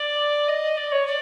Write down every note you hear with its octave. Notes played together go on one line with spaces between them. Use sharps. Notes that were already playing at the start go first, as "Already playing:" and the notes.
Already playing: D5
D#5
D5
C#5
D5